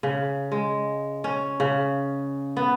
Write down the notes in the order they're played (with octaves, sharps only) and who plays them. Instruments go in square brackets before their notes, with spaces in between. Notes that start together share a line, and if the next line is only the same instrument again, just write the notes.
[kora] C#3
G#3
C#4
C#3
B3